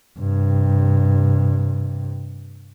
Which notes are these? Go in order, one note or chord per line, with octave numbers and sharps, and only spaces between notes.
G2 C3